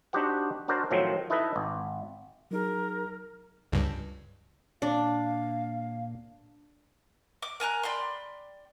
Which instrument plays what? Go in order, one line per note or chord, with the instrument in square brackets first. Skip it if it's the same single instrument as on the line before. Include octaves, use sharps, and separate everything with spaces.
[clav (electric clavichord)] D4 D#4 F#4 G4 C5 F#5
D4 F#4 A#4 C5 D5
A2 D#3 F3 F#3 C4
D#4 E4 A4 B4 D#5 E5
G#1
[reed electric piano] F#3 D#4 G#4 [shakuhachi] A#4
[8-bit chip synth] C#2 G2
[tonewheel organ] A#2 [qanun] D4 [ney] F5
[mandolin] D6
A#4 G#5 A#5 F#6
D5 G5 B5 C6